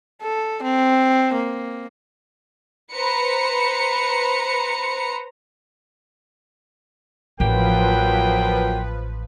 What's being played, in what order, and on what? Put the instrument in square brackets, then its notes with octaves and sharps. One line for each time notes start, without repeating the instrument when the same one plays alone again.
[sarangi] A4
C4
A#3
[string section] B4 C5 A#5 C#7
[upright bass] A1 [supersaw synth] F3 B4 [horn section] F#3 A#3 G5